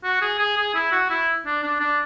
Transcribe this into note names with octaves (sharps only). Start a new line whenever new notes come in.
F#4
G#4
G#4
G#4
E4
F#4
E4
D4
D4
D4